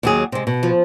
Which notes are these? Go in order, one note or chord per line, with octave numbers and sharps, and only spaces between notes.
D#2 F#3 G#4
C3 G#3
B2
F3